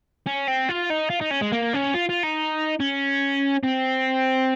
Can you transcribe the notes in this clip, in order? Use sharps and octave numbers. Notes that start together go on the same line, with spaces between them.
C#4
C4
F4
D#4
F4
D#4
C#4
G#3
A#3
C#4
F4
F4
D#4
C#4
C4